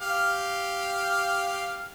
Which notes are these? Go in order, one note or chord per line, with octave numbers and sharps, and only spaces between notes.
G4 F5